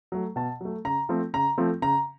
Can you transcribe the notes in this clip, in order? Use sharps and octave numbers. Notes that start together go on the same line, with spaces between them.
F#3 A3
B2 A5
F#3 A3
C#3 A#5
F3 A3 C4
C#3 A#5
F3 A3 C4
C#3 A#5